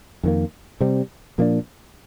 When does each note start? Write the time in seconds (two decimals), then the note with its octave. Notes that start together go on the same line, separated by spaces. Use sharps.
0.23 F2 D#3 A#3
0.81 C3 G3 C4
1.38 A#2 F3 A#3 D4